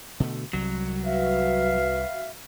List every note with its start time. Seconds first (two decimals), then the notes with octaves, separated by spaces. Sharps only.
0.20 B2 D3 A3
0.53 C2 F#3
1.05 F#4 B4 E5 F5